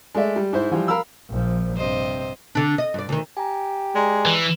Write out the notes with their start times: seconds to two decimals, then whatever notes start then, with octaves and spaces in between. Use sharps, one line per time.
0.15 G#3 A3 D5 E5
0.36 G3
0.53 G#2 E4 C5
0.72 E3 F3 G3
0.88 A#4 F5 B5 E6
1.30 A#1 F3
1.76 G2 C3 C5 D#5
2.55 D3 D4
2.78 D#5
2.94 G2 D5
3.09 D2 D#3
3.37 G4 G#5 A#5
3.95 G#3 D5 A#5
4.25 E3 B4